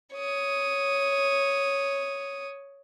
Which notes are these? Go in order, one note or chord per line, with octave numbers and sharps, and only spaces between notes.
C#5 D#6